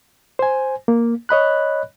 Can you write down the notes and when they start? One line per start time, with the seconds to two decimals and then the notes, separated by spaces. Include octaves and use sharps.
0.39 C5 G#5
0.88 A#3
1.29 C#5 D#5 B5 F#6